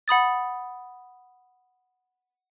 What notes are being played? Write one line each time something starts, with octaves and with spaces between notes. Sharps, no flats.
F#5 B5 D#6 A6